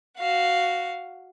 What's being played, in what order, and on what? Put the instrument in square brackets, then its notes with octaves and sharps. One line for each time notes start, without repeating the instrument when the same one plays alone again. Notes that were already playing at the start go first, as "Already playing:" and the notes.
[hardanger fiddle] F#4 F5